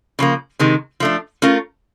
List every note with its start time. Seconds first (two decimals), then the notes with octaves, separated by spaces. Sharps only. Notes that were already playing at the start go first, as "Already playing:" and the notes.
0.19 C#3 F3 A#3
0.59 C3 D#3 G#3
1.00 F3 A3 D4
1.42 A3 C#4 F4 A#4